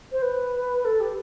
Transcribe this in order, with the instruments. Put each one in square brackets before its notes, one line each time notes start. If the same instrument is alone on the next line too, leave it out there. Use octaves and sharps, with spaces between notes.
[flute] C5
B4
A4
G4